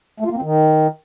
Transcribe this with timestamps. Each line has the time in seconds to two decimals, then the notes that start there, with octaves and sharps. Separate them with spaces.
0.20 A3
0.26 F4
0.31 A#3
0.37 C4
0.42 D#3